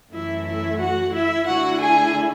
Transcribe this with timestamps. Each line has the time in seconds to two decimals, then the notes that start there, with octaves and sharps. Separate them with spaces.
0.13 F#2 E3 A3 E4 E5
0.46 E4 E5
0.80 F#4 F#5
1.13 E4 E5
1.47 D3 A3 E4 F#4 F#5
1.80 G#4 G#5